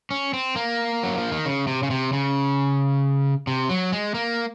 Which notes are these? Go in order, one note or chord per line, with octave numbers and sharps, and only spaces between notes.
C#4
C4
A#3
F#3
F3
D#3
C#3
C3
C#3
C3
C#3
C3
F#3
G#3
A#3